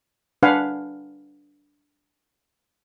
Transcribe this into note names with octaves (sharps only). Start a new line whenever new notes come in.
D4 B4 F5 F#5 G#5